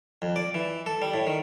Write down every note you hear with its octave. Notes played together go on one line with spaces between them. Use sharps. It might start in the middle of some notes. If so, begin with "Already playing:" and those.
F2
D5
E3
A4
G3
A2
D#3